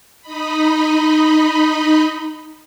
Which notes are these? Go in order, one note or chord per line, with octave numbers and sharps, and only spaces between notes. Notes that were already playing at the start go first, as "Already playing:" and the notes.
D#4 D#5 B5